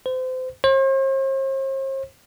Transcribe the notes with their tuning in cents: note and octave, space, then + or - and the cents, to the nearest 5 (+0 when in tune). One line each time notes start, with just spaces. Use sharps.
C5 -30
C5 +45